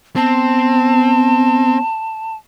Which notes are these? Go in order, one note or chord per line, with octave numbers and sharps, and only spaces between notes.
B3 C4 A5